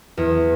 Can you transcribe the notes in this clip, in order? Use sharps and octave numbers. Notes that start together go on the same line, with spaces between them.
E2